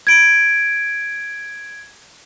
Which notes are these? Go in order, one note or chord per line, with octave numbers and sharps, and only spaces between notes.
G#6 D7